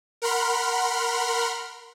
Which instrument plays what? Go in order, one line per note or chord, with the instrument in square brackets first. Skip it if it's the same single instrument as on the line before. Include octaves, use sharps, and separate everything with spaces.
[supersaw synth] A#4 F#5 B5 C6 F6